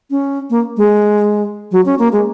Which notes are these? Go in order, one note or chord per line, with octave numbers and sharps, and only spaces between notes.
C#4
A#3
G#3
F#3
C#4
A#3
G#3